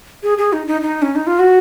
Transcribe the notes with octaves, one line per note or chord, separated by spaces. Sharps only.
G#4
G#4
D#4
D#4
D#4
C#4
D#4
F4
F#4